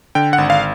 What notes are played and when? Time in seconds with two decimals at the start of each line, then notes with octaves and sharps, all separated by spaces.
0.15 D3 G5
0.33 F#5
0.38 G#1
0.50 F5